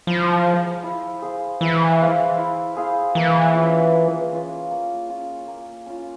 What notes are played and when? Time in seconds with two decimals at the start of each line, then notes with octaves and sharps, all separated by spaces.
0.07 F3 E4
0.45 G#4 C5 F5
0.83 E4
1.22 G#4 C5 F5
1.61 E3 E4
2.00 G#4 C5 F5
2.38 E4
2.77 G#4 C5 F5
3.15 E3 A#3
3.55 C#4 F4
3.93 A#3
4.32 C#4 F4
4.71 A#3
5.09 C#4 F4
5.48 A#3
5.86 C#4 F4